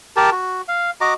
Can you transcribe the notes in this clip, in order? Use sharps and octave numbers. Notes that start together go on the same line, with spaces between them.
G4 A#4 A5
F#4
F5
F#4 D#5 A#5 D6